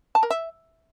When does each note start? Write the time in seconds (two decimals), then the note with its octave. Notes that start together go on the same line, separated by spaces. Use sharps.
0.15 A5
0.23 A#4
0.30 E5